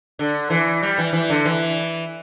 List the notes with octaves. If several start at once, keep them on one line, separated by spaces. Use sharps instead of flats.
D3
E3
G3
E3
E3
D3
E3